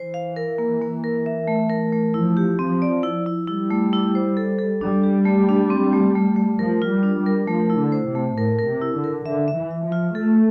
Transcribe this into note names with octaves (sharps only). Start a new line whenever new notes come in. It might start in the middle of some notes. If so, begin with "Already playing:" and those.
Already playing: E3 C5
F5
A#4
A#3
A#3
A#4
E5
A3
A#4
A3
F3 E4
G4
F3 C4
D5
E4
E4
G3 E4
A3
E4
C5
A4
A4
G3 D4
G4
A3
D4
C4
A3
A3
A3
F3 A#4
F4
G3
D4
G3
A#4
F3 A3
E4
D3
C5
C3
A3
A2 A#4
A#4
C3
E4
D3
A#4
D3 E5
E5
E3
E5
F3
F4
A3 A4